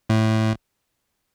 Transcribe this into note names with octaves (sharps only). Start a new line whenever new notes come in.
A2